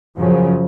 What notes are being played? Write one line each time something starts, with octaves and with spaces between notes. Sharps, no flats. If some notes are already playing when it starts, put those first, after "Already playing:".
F#2 C#3 F3